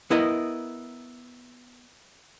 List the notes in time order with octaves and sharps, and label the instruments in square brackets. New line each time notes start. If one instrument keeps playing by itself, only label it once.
[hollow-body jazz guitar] B3 E4 A#4 D#5